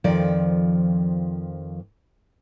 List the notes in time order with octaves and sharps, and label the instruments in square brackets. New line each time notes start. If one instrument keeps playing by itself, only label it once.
[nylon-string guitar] F2 D#3 F3 D5